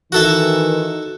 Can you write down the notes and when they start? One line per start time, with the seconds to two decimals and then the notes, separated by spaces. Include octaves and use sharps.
0.12 D#3 E3 F#4 A4 E5